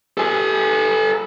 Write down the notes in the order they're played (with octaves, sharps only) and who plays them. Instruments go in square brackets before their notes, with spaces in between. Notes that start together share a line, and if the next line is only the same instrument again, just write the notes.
[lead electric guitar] A4 G#5